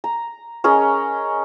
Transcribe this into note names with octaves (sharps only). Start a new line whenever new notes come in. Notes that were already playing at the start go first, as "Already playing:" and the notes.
A#5
C#4 G#4 A#4 D#5